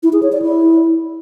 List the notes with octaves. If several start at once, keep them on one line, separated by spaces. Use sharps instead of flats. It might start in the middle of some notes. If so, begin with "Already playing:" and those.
E4
G#4
C#5
D5
E4